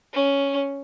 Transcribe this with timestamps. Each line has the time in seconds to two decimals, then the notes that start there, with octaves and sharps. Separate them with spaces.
0.14 C#4